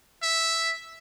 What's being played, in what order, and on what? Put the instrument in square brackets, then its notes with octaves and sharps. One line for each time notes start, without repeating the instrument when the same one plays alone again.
[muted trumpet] E5